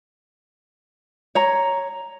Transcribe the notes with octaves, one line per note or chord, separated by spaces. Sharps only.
C#5 A#5